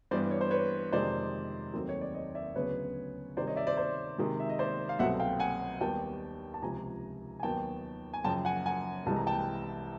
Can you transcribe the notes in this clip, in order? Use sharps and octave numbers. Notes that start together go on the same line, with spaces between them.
G2 E3 G3 B3 C5 D5
C#5
C5
B4 C#5
F2 C3 D#3 G#3 C4 C5 D5
D#2 D#3 F#3 A3 C4
C#5
D5
C#5 D#5
D5 E5
D2 C#3 F#3 B3 B4 C#5
C3 D#3 G3 C5 D5
C#5 D#5
D5 E5
C5 D5
C5 D5
C3 D#3 G#3
E5
D#5
C5 D5
F5
C2 B2 F#3 A3 C4 E5 F#5
F5 G5
F#5 G#5
D#2 D#3 G3 B3 G5 A5
A5
C#2 C3 F3 G#5 A#5
G#5
D#2 D#3 F#3 B3 G5 A5
G#5
F#2 C#3 F3 G5 A5
F#5 G#5
F#5 G#5
C2 C3 E3 G#3 A5
A#5
G5 A5